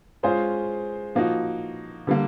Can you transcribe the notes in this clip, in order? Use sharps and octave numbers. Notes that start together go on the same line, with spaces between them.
G#3 C#4 F4 G#4 C5
F3 A#3 D#4 F#4
D3 G3 A#3